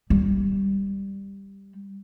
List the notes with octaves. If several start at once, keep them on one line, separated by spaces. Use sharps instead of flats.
G3